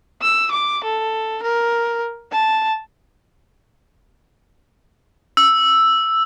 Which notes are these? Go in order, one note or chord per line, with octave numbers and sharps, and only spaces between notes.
E6
D6
A4
A#4
A5
E6